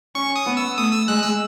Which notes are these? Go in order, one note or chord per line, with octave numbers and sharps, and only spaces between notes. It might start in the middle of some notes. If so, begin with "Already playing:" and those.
C#4 C#6
D#6
B3
E6
A3 D#6
E6
G#3 F#6
E6